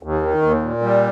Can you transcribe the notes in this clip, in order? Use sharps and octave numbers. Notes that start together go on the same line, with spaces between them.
D#2
D#3
D#2
A#2
G3